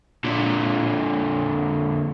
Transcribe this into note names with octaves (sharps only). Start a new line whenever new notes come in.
A#2 D3